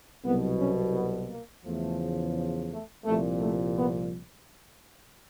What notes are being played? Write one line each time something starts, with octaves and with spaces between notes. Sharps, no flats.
C2 B2 F#3 B3
C#4
B3
A#3
E2 C#3 F3 A3
A3
C2 A#2 F3 A3
A3
B3